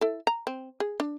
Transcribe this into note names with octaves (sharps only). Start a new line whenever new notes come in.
E4 A4
A#5
C4
G#4
D4